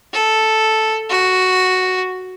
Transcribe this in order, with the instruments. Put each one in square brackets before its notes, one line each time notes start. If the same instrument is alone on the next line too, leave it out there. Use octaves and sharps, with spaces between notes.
[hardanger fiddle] A4
F#4